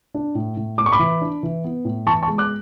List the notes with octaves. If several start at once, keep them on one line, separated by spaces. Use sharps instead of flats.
D4
A2
A2
A2 D6
C#6
B5 D6
E3
D4
E3
B3
A2
E3 A5 C#6
A5 C#6
G#3
D6 F#6